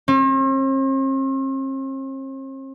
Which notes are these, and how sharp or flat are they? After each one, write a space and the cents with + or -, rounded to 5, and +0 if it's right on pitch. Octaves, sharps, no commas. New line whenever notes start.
C4 +45